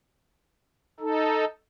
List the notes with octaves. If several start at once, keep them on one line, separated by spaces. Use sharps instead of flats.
D#4 A4